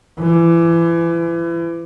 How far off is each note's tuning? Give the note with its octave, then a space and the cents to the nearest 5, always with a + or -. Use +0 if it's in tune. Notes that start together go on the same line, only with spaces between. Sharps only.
E3 +30